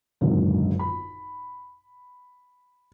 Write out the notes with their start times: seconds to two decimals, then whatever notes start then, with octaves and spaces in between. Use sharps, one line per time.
0.21 G#1 C#2 F#2 A#2 D3
0.79 B5